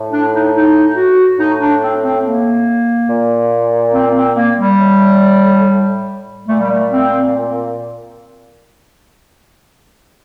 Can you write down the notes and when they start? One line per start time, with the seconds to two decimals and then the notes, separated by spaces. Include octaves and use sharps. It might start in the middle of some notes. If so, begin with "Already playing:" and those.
Already playing: A2
0.11 D4
0.33 D#4
0.54 D#4
0.96 F#4
1.38 A2 D#4
1.60 D4
1.82 C4
2.03 C4
2.24 A#3
3.09 A#2
3.94 C4
4.15 C4
4.35 A#3
4.58 G3
4.78 A2
6.48 A#2 A3
6.60 G3
6.71 A3
6.90 C4